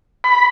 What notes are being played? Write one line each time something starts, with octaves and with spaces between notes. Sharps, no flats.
B5